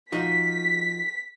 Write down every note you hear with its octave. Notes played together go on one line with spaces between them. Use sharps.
F3 D#4 F#4 B6